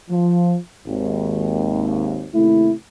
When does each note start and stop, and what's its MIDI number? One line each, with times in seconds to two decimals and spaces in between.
0.11 0.57 53
0.86 2.28 32
0.86 2.28 39
2.35 2.73 39
2.35 2.73 48
2.35 2.73 57
2.35 2.73 64